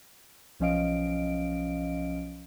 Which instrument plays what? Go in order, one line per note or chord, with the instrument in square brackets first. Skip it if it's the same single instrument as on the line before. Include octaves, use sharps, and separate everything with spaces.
[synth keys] B1 F3 C#4 D#5 F5 D7